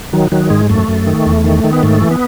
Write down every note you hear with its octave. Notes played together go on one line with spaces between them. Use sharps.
D#3 F#3
D#3 F#3
G#2 G#3
F#2 A3
F#2
D#3
E2
D#3
D#3
B3
G#2 A3
E3
B3